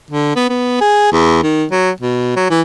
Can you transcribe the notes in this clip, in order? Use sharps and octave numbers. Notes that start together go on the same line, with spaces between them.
D3
B3
B3
G#4
E2
D#3
F#3
B2
F#3
E3